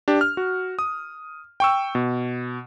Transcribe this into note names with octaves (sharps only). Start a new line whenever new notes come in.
D4 G4
F6
F#4
D#6
G5 C#6 E6
B2